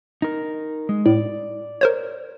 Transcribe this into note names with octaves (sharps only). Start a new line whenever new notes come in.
D#4 A#4
G#3
A2 D5
A#4 C5 C#5